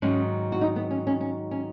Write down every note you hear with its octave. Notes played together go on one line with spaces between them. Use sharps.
G#2 D#3 F#3 C#4
F#4
D#4
B3
C#4
C#4
C#4
C#4